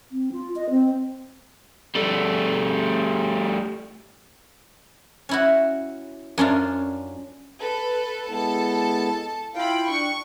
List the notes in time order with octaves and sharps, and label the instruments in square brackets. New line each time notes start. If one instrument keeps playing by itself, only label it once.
[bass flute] C4
F4
D#5
C4
[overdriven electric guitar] G3 A3
[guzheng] C#4 E4 F#4
F#2 C#4 D4 F4
[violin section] A4 B4
[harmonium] G#3 B3 E4 [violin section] A4 A5
[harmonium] E4 F4 F5 [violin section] G5 B5
[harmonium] D4 [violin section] C#6